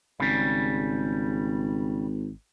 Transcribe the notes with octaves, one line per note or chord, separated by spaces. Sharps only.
G#1 C#3 G3